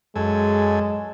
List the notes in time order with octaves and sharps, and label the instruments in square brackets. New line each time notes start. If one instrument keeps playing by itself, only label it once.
[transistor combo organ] F#2 A4 G#5 [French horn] G#3